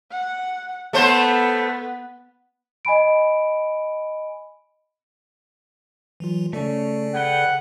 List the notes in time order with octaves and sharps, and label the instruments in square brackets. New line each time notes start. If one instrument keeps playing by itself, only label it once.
[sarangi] F#5
[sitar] A3 A4 C5 [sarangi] B3
[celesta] D#5 G#5 B5 D7
[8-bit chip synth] E3 F#3 F4
[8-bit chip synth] C#3 A4 D5 [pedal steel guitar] A3 C#4
[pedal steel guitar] G#4 B4 G5 [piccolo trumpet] F#5